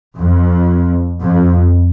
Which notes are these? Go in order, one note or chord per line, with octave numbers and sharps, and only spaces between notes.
F2
F2